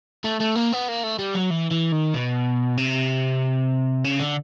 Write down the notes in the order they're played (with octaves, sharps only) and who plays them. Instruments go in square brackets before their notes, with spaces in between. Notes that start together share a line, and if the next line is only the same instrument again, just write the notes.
[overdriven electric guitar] A3
A3
A#3
B3
A#3
A3
G3
F#3
E3
E3
D#3
B2
C3
C#3
D3